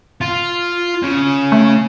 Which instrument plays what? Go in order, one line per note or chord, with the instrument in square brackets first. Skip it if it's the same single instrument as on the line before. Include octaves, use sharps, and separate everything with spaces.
[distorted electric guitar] F4
C#3
[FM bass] A3